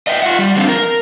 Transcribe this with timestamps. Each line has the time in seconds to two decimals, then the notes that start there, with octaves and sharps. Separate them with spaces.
0.07 D#5 E5 G5
0.22 F4 F#5
0.39 G3
0.56 F3 G#3 C4 D4 F4
0.69 A#4